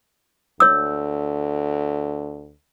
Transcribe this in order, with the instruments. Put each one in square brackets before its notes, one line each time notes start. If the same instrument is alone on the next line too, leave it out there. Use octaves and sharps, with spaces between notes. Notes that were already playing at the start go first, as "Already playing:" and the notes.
[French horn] D2 [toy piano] C#5 E6